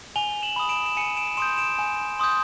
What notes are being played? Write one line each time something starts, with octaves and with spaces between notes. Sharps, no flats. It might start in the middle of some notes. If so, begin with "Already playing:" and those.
G#5 F7 G7
E7 F#7
B5 D#6
D7 E7
E7
G#5 C#7 D#7
D7 E7
C6 D#6 G6 D7 E7
D7 E7
G#5
C6 D#6 G6